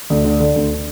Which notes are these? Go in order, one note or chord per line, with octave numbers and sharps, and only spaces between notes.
D2
D3
D3
D2